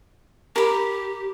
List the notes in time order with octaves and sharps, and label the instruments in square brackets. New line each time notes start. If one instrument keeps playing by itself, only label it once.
[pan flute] G4 [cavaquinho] A#4 B5